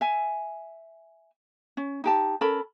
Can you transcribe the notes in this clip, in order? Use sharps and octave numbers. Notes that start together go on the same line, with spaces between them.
E5 G#5
C#4
D#4 G4 A5
C#4 A4 A#4 B5